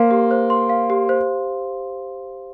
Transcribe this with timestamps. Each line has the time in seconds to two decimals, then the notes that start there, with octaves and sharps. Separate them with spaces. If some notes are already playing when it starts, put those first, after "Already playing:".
Already playing: A#3 C5 F5 C6
0.11 G4
0.31 C5
0.50 C6
0.69 F5
0.90 G4
1.09 C5